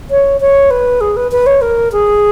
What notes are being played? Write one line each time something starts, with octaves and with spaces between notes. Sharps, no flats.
C#5
C#5
B4
G#4
B4
B4
C#5
A#4
G#4